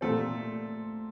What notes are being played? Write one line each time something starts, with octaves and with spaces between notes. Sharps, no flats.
A#2 A3 C4 A4